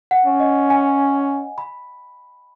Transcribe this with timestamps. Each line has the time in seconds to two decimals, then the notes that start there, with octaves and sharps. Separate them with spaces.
0.11 F#5
0.26 C#4
0.40 D#5
0.70 G#5
1.58 B5